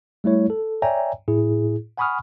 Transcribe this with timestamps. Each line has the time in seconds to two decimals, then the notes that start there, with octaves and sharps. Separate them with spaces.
0.24 G3 A3 E4 C#5
0.50 A4
0.82 C#5 D5 E5 G5 G#5 A#5
1.28 A2 E4 G#4
1.97 F#5 G#5 B5 C#6 D#6 F6